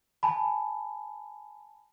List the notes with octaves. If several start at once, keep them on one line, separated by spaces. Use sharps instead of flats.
G#5 A5 B5